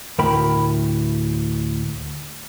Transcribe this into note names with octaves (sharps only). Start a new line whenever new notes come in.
D2 A2 A#4 G5 B5